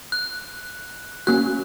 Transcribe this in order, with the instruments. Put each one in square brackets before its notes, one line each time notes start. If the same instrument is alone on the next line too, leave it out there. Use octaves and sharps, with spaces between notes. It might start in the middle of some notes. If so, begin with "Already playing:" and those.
[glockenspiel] F#6
[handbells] A#3 C#4 F#4 [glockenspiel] F#6